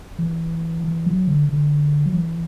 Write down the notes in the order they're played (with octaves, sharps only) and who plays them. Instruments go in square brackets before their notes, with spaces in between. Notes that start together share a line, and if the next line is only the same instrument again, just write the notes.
[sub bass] E3
E3
F#3
D3
D3
F#3
E3